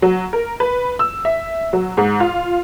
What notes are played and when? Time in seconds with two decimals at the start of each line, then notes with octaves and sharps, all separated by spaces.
0.02 F#3
0.33 A#4
0.60 B4
0.99 E6
1.25 E5
1.73 F#3
1.97 G#2
2.20 F4